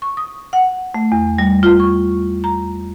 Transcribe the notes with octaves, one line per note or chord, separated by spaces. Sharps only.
C#6
D#6
F#5
A3
E2
G3
F4
C#6
A#5